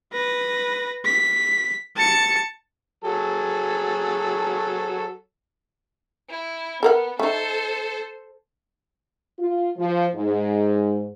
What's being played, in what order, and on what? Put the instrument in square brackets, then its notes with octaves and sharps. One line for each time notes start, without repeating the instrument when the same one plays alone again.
[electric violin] B4 A#6
B6
A5 C#7
[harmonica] F#3 G#4 A4
[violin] E4
[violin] B3 [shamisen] A4 A#4 F#5
[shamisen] A3 D#4 [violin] A4 C5
[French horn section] F4
F3
G#2